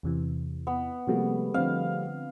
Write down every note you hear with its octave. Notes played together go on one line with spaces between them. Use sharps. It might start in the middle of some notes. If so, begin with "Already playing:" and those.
E2 C3 E3
B3
C3 F3 G3 A3 A#3 G#4
D3 F3 C4 F5